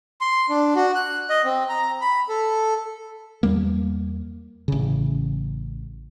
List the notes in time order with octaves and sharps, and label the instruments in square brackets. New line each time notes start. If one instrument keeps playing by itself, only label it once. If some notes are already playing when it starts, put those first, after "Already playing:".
[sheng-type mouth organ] C6
D4
F#4
F#6
D#5
C4
A#5
B5
A4
[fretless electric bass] E2 G3 A#3
A1 C#3